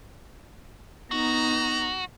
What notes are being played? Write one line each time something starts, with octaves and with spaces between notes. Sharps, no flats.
B3 D#4 F#4 A#5